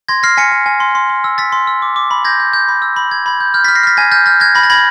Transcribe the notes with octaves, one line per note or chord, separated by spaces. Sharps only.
C6 G#6 A#6
F6 A#6 C7
G#5 B6 C#7
G#5
G#5
C6
C6
C6
E6
E6 A6 B6
C6
E6
D6
D6
B5
G6 G#6 A#6
G6
G6
B5
E6
B5
B5 G#6
B5 G#6
G6
F6 G6
F6 A6 B6
A#6 C7
F6 A6 B6
G#5 G#6 A#6
F6 G6 A6
F6 G6 A6
F#6 G#6 A#6
B5 G#6 A#6
A6
B5 G#6 A#6